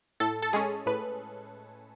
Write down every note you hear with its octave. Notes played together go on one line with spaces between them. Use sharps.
A2 A4
A4
G#3 C#4 G#4
A2 B4